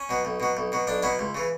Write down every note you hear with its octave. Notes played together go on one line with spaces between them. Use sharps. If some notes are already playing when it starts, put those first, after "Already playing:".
Already playing: C#4
B2 F#3
B1
B2 F#3
B1
B2 F#3
B1 D4
B2 F#3 E4
C#2
C#3 E3